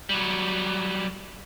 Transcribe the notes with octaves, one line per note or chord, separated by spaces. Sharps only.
F#3 G3